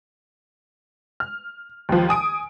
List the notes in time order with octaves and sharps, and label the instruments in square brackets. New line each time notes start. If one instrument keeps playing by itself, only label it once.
[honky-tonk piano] F6
D#2 F3
G#5 D#6 D7